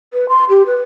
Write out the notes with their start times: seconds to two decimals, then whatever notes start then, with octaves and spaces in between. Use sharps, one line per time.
0.13 B4
0.29 C6
0.49 G4
0.66 B4